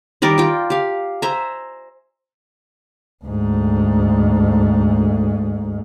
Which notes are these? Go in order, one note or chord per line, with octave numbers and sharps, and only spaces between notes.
D#3 G3 A#4 D5
F4 G5
G4 F5
C5 E5 G#5 A#5
D2 G#2